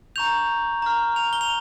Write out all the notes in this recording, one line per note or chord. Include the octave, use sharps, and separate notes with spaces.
A#5 C#6 G6 F7
A#5 F6
F7
G7
F7